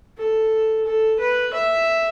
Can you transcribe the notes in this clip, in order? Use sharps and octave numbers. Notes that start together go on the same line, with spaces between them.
A4
A4
B4
E5